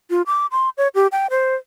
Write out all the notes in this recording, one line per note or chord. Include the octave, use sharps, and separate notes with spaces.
F4
D6
C6
C#5
G4
G5
C5